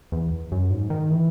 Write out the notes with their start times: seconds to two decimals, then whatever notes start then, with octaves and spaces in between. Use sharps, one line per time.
0.12 E2
0.52 F#2
0.70 G#2
0.90 D#3
1.10 E3